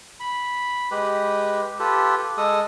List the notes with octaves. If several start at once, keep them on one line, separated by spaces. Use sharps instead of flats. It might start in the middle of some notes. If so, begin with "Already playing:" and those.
B5
G#3 G4 B4
F4 G4 A4 B4
G#3 A4 D#6